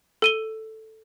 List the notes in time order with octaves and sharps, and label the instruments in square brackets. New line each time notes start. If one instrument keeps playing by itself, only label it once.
[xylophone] A4 D#7 G7